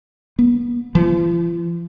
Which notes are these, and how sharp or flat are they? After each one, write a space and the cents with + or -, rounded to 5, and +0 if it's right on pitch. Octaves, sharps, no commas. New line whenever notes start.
B3 -40
F3 -45